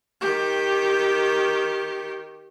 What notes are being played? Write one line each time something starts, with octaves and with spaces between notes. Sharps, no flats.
D#3 G4